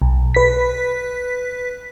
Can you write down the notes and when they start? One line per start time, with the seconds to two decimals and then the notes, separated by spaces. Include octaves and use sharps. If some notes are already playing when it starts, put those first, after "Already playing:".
0.02 B1
0.34 B4 B6